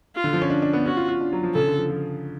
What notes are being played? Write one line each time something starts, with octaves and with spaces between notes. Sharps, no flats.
F4
D3
F3
C#4
D4
D4
B3
C#4 F#4
F4
F4
D4
F#3
F3
C#3 A4
D3
F3
F3